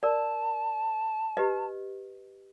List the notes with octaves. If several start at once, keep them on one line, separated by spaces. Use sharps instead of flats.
A#4 D5 A5
G4 B4 D#5